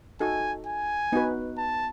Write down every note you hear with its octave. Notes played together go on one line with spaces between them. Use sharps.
D#4 F#4 A4 G#5
G#5
B3 D#4 F#4 B4
A5